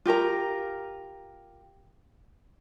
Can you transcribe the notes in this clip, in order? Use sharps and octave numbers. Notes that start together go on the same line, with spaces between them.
F4 G4 A#4 A#5